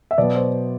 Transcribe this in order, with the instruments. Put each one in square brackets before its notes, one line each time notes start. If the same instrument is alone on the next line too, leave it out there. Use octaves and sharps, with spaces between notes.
[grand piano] E5
B2 F#3 B3 D5
C5